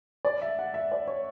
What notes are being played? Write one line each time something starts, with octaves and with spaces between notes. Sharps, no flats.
D5
E5
F#5
E5
D5
C#5